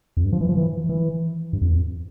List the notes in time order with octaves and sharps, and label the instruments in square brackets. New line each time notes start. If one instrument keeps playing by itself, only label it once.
[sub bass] F2
G2
F3
E3
F3
E3
E3
G2
F2
E2
F2